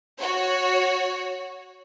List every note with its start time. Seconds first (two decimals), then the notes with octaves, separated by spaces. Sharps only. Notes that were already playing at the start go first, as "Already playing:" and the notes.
0.19 F#4 C#5